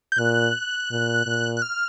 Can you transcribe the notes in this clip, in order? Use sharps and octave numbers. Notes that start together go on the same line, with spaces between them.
G6
A#2 F#6
A#2
A#2
F#6
F6